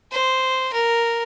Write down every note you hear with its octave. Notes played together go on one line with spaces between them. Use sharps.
C5
A#4